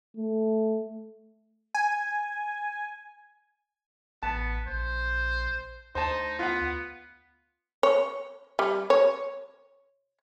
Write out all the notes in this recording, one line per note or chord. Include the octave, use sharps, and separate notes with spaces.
A3
G#5
A1 B3 A5
A#1 C5
D2 D#4 C5 A5
B3 F4 F#5
C#5
G3
C#5